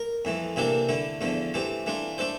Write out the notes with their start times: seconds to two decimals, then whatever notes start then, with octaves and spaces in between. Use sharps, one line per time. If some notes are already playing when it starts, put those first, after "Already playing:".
Already playing: A#4
0.25 F2 E3 A3
0.56 C3 E3 A#3 D4 A4
0.89 D3 A3 E4
1.21 E2 D3 F3 A3
1.54 E3 A3 C4 G4
1.86 E3 A3 D4 F4
2.18 A3 D4 A4 C5